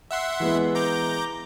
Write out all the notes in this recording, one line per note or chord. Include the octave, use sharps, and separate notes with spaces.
E5 F#5 C6
E3 G#3 B3
A#5 D6 G6